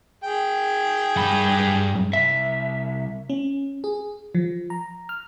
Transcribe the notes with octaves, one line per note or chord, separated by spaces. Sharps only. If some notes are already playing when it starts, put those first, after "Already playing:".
G#4 G5
G2 B5
C2 E5
C#4
G#4
F3
A#5
F6